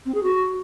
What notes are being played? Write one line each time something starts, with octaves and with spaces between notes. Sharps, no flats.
C4
G#4
F#4